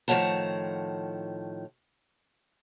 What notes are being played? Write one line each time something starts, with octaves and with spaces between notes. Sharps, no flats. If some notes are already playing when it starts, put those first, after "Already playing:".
A2 D#3 F3 C#5 F#5 A5